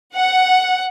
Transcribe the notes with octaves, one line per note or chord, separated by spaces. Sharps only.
F#5